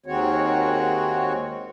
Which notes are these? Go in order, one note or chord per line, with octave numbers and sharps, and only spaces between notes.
D#2 D#3 G#3 C4 F#4 C#5